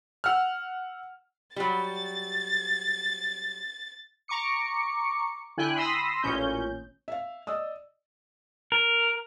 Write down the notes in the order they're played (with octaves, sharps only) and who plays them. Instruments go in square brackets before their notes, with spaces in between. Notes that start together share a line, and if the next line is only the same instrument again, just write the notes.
[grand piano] F#5 E6 F6
[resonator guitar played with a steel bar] F#3 G3 [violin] A6
[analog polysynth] A#5 C#6 D6 C#7
D3 E4 G5 G#5 F#6
B5 C6 D#6 E6 A#6
A1 A#2 C#4 G6
[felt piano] E5 F5
D5 D#5 D#6 E6
[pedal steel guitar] A#4